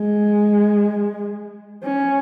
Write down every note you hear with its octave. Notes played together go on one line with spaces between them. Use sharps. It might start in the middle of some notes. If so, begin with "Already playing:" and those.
Already playing: G#3
C#4